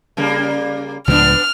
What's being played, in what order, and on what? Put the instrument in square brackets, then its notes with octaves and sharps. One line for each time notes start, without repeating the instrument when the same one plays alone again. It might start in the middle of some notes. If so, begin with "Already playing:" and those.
[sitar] C#3 G3 A#3
[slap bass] C#2 A2 F3 [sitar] B3 D4 [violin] F6